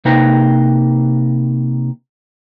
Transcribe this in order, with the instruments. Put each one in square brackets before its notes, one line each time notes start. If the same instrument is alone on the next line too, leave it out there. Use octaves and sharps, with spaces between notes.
[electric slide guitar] C3 A#3 D#4 B4 G5 A#5